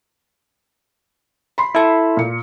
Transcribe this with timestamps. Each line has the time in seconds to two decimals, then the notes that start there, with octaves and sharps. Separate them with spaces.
1.58 B5 C6
1.75 E4 A4
2.17 A#2 C#7